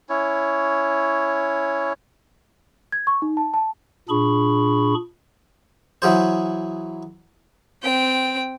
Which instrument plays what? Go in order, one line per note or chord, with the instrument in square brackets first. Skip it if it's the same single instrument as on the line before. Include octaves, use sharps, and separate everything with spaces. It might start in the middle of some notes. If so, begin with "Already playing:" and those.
[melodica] C#4 E4 C#5
[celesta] G#6
C#6
D#4
A5
A5
[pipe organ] A#2 D4 G#4 B5 C#6
[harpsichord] E3 F#3 G#4 C5
[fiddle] C4 G5